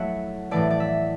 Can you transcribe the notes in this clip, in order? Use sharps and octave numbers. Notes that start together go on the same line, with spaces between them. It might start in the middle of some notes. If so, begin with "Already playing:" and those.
Already playing: F#3 A3 E4 F#5
A2 E3 A3 D5
D5
E5